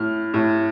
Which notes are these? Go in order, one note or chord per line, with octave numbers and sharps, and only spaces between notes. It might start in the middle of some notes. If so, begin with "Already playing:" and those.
Already playing: A2 F6
A2